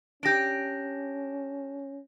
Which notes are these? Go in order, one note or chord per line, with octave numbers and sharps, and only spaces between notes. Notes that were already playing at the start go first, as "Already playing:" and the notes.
C#4 D4 G4 G6 A#6 D7